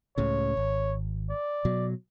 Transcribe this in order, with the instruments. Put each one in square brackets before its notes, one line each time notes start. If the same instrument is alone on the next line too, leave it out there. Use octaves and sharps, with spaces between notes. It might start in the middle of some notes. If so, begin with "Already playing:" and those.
[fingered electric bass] C#2 A2 C#3 [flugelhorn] C#5
[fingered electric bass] G#1
[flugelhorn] D5
[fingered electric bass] B2 F#3